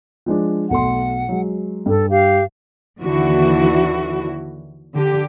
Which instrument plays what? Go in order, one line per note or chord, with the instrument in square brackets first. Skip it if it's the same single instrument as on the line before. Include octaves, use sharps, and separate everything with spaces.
[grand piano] F3 G#3 D4
[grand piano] B1 A3 C6 [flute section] F#5
[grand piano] F#3 G#3
[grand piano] G2 [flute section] A4
[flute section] G4 F5
[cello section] D#2 D3 E3 E4 F#4
D3 G4